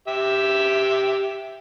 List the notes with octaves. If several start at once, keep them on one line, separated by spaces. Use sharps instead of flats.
G4 E5